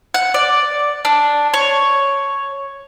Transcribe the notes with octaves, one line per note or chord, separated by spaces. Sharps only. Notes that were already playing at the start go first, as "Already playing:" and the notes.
F#5
D5
D4
C#5